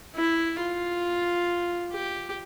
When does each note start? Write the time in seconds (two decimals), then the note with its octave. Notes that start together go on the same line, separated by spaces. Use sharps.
0.16 E4
0.60 F4
1.93 G4